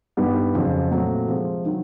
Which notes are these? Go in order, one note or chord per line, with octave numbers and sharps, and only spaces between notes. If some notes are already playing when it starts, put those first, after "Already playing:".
G2 D#3 G3 B3
F2 C#3 F#3
A#2 F#3 A3 C4
C3 F3 G#3
D#3 F#3